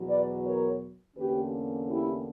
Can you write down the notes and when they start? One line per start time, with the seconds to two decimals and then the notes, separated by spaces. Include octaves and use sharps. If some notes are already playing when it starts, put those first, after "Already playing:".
Already playing: E2 B2 F#3
0.08 B4 D5
0.45 A#4 C#5
1.17 E2 D3 A#3 C#4 G4 B4
1.89 E4 G4